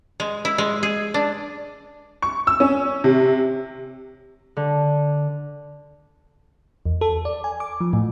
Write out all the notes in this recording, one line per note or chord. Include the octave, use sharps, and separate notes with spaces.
G#3
E4
G#3
G#4
D4
C#6
E6
C#4
C3
D3
E2
A4
D5
G#5
D6
F3
A2